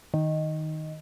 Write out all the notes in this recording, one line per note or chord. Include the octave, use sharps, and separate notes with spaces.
D#3